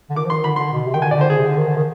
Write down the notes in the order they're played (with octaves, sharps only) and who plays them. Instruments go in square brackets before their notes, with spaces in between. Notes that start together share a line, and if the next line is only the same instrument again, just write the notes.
[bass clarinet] D3
[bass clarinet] D#3 [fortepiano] D6
[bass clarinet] F3
[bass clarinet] D#3 [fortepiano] C6
[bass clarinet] D3 [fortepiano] B5
[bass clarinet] D3 [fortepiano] C6
[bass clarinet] B2
C3
[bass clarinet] D#3 [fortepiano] G5
[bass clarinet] D3 [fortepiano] G#5
[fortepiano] D5
[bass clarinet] D3
[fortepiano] C5
[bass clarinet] D3 [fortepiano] G#4
[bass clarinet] C3
D3
D#3
D3
D#3